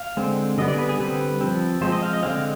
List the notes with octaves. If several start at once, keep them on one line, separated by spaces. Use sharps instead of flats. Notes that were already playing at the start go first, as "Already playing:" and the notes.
Already playing: F5
D3 G#3 C4
D3 G3 B3 D#5
D5
G#4
B4
G#4
D3 G3 C4 B4
F3 C4
F3 G#3 C4 C5
D#5
F5
D#5
D3 G#3 C4 F5